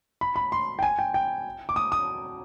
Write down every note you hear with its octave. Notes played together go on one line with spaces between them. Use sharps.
B5
B5
C6
G5
G#5
G5
G5
D6
D#6
D#6